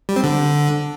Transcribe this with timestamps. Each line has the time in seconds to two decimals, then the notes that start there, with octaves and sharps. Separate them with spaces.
0.09 G3
0.16 C4
0.24 D3